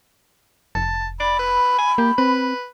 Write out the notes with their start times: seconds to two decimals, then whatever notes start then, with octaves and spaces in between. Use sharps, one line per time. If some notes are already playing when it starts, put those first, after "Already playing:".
0.75 F1 A5
1.20 D5 B5
1.40 B4
1.79 G#5
1.98 A#3 G4
2.18 C4 B4